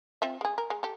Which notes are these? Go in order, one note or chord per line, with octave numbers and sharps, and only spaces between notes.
C4 F4 E5
G#3 G#4
A#4
G#3
G4 A4